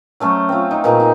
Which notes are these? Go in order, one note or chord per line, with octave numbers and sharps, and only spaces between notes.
F#3 A3 C#4 C5
C4 F4
D#4
A#2 E3 D#4 G#4
D#4